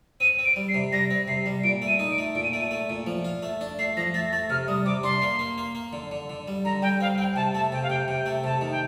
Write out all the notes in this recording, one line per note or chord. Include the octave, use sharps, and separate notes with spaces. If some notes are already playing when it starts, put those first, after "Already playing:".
C4 D#7
C4
D7
G3
C7
C3
G3 A#6
C4
C3 C7
G3
A#2 D7
A3
D#7
D#4
D7
A3
A#2 D7
D#7
A3 D7
D#7
A3
A#2
F3
F4
A3
D4
A3 C7
F3 A#6
A3 A6
A#6
A3 A6
C3 F6
G3 D#6
C3 D6
D4 C6
A#3
A#3
A#3
A#3
D3
D3
D3
G3
D3 A#5
G3 G5
C4 F5
C4 G5
G5
C3 A5
A3 A5
C3 G5
F5
C3 G5
C3 G5
A3
C3 A5
D#3
G5